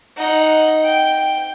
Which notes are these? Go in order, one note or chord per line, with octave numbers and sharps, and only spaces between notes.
D#4 F#5
G5